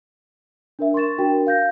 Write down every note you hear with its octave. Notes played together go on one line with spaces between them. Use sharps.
D4 A#4 E5
C6 C#6 A6 E7
D4 F#4 A#4 G5
F5 G6 A#6